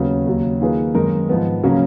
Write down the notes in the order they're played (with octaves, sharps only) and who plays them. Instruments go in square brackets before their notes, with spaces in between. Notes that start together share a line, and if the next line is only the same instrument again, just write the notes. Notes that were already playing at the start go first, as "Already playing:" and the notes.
Already playing: [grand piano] D#2 C#3 F#3 B3
D#2 C#3 F#3
D#3 A#3 F4 G#4 B4
F#2 D#3 G#3 D#4 A#4
G#2 F3 B3
C#3 F#3 A#3 C#4